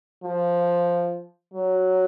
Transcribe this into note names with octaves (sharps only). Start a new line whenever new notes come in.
F3
F#3